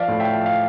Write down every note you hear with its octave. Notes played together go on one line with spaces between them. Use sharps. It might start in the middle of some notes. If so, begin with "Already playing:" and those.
Already playing: F3 D5 F5
A2
E5 G5
F3
F5